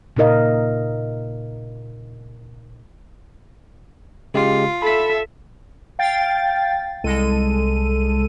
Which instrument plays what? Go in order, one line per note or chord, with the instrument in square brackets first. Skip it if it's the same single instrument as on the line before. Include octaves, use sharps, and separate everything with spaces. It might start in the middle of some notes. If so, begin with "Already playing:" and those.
[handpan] A#2 C#3 D#4 A#4 D#5 F5
[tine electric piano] C#3 G#3 G4 [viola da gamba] F4
[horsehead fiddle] A4 E5 [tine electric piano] B5 B6
[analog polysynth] F5 G5 A6
C2 G#3 A4 D#7